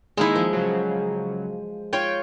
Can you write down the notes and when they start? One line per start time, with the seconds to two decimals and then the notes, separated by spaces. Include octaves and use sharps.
0.17 D#3 G#3 A#3 D#4 E4
0.36 F3
0.53 C#3 F#3
1.93 F4 C#5 G5